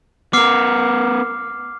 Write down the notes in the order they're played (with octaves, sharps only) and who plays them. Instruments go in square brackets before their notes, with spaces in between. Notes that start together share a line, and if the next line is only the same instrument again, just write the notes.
[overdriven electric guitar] B3 A#4 [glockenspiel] D6 F6 C7